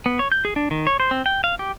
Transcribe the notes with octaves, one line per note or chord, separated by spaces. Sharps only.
B3
C#5
G6
G#4
D4
D#3
C#5
C5
C4
G5
F5
G4